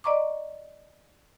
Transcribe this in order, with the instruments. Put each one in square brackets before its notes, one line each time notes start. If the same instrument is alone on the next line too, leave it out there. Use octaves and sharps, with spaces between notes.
[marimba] D5 D#5 A#5 C#6 D6